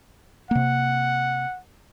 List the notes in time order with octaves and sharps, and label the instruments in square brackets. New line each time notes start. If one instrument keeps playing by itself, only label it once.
[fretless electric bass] C3 A#3 [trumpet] F#5